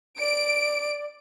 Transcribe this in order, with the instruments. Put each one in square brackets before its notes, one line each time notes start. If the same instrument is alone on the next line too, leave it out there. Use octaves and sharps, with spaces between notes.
[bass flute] D5 [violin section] D7